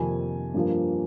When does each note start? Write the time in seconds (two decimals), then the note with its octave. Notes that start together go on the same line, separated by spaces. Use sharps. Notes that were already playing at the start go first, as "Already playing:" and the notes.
Already playing: F2 C3 D#3 A#3 G#5
0.54 G2 F3 A#3